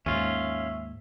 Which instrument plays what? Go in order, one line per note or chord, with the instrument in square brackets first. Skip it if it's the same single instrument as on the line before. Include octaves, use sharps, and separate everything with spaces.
[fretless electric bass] D#2 G#2 [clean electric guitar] C#4 F4 [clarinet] E5